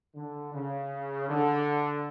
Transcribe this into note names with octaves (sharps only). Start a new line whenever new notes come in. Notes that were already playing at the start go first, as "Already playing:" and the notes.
D3
C#3
D3